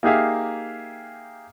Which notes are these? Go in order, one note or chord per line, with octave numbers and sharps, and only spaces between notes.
A#3 D#4 G4 G#4 E5 F5